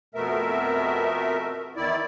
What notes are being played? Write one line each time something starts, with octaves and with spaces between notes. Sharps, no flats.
F2 B2 A3 B3 A#4 E5
E2 D#3 E4 D5